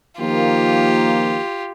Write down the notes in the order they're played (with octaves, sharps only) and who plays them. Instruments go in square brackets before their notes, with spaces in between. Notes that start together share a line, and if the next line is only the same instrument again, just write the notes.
[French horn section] D#3 F3 A#3 [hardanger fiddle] F4 G4